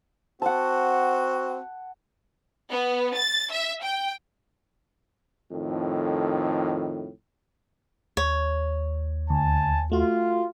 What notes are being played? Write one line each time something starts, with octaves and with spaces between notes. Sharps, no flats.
C4 F#4 F#5 A5
B3
A6
E5
G5
F2 A2 D#3
D#2 C#5
D2 G#5 A5
A3 F4 F#4